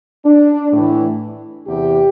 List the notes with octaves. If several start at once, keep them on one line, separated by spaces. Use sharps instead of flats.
D4
A2 E3
E2 C3 E3 G4